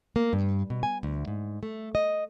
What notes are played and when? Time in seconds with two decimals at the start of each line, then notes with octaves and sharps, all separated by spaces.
0.16 A#3
0.33 G2
0.70 B2
0.83 G#5
1.03 D2
1.28 G#2
1.63 A3
1.95 D#5